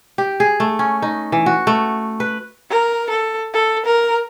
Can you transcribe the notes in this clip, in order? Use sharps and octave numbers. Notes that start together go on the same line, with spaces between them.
G4
G#4
A3
C#4
D#4
E3
F#4
A3
B4
A#4
A4
A4
A#4